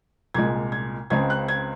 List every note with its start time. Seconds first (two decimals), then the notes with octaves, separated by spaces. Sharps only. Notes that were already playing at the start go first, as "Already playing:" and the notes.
0.34 C2 A#2 G#3 G#6
0.72 G#6
1.10 C#2 C#3 G#3 C4 G#6
1.30 F#6
1.48 G#6